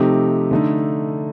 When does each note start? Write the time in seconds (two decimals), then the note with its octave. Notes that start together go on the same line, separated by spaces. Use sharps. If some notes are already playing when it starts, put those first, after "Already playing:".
Already playing: C3 F3 A3 D#4 G4
0.51 D3 A3 D#4